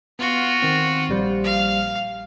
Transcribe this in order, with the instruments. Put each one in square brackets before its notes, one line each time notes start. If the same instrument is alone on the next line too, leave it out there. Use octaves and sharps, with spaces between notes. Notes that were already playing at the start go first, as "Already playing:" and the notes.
[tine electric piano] B3 [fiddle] F4 F#4
[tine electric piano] D#3 C4
A#1 G3 C5
[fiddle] F5